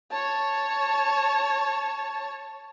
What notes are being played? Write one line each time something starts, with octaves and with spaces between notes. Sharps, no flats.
C#5 A5